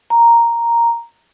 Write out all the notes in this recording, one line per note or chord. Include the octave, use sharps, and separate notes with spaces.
A#5